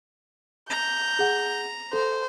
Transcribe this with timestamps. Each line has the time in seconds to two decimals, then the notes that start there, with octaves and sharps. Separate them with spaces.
0.70 A#5 G6
1.19 G#4 F#5
1.93 A4 C5